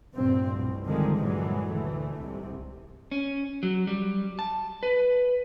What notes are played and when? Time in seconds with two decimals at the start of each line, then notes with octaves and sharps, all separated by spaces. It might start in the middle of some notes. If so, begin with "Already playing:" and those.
0.14 F1 B1 G2 A#2 C4
0.49 C2 B2
0.85 D3 D#3 F3 G3 G#3
1.16 G2 A#2 D3 E3 F#3 G#3
1.68 D2 E3 A3
2.18 C2 G#2 C3
3.11 C#4
3.63 F#3
3.87 G3
4.39 A5
4.83 B4